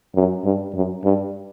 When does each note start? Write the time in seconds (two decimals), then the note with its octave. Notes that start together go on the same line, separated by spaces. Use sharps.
0.15 F#2
0.44 G2
0.74 F#2
1.04 G2